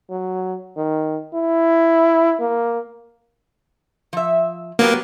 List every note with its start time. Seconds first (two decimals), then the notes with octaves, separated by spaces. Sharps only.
0.10 F#3
0.77 D#3
1.34 E4
2.40 A#3
4.13 F3 E5
4.79 F#3 A#3 B3 G4